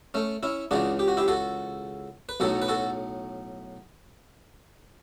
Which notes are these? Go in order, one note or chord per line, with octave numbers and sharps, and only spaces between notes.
A3 C#4
C#4 E4
C#2 C#3 E3 D4 F#4
G4
F#4
E4 G4
F#4 A4
B4
B1 A2 F#3 F#4 A4
B4
F#4 A4